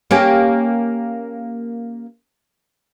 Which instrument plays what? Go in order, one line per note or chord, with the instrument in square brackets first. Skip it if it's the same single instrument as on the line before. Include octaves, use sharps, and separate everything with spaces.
[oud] A#3 C#4 G4